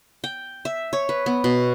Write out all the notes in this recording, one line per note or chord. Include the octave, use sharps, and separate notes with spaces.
G5
E5
C#5
B4
B3
B2